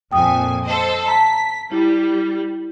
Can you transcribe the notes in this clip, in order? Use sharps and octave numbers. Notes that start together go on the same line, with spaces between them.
F2 A#2 G5 G#5 D#6
A4 C5 D#5
A5 A#5 B6
G3 E4